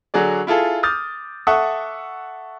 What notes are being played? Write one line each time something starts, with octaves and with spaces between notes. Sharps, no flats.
D3 F#3 F#4 G#4 D5
E4 F4 G#4 A4
D6 D#6 F6 G6 A6
A4 E5 F#5 C#6 D#6